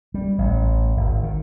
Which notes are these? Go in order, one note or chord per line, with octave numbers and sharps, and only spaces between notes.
G3
A1
G#1
D#3